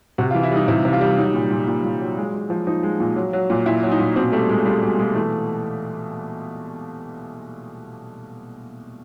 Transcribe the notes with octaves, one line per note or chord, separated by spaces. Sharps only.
C3 F#4
F4
E3
E4
G3 D#4
C3 E4
C3
F4
G3
F#3 D#4
A#2
A#2
A#2
A#2
F#3
G#3
G#3
F3
F3 D#4
G#3
A#2
F#3
F#3
A#2
A#2 E4
F#3
D#4
A#2
B2 C4
G3 A3
B2 G#3
A3
G3 G#3
B2 G#3
B2 G#3
E3 A3